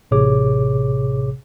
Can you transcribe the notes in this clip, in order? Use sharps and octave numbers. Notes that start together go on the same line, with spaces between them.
A1 A2 C3 G#4 C#5 D6